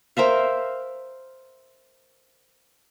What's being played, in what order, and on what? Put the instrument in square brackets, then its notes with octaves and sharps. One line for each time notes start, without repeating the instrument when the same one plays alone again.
[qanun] A#4 C5 E5 F5